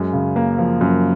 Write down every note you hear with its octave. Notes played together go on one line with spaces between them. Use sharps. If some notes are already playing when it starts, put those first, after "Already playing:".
Already playing: F#2 G#3
C#3
A#3
F3
F#2